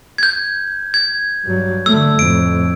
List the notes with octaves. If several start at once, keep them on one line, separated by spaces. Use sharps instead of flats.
G6 G#6
G#6
G2 F#3
D3 A3 E6
F2 A2 D7